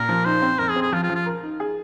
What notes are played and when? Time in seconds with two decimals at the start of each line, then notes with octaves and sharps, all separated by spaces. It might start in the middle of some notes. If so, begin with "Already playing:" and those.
Already playing: A#2 A#4
0.09 F3
0.25 D#4 C5
0.42 C4
0.59 F2 A#4
0.70 G#4
0.76 C4
0.82 G#4
0.92 F3 F4
1.04 F4
1.09 F3
1.16 F4
1.26 A#4
1.43 D#4
1.60 G#4